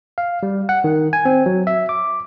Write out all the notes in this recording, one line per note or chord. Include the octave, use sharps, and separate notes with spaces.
F5
G3
F#5
D#3
G#5
C4
F#3
E5
D6